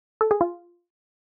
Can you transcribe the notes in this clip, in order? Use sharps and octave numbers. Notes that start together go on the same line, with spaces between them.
A4
G#4
F4